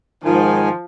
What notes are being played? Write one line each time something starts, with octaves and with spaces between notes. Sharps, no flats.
G#2 D#3 F3 F4 G#5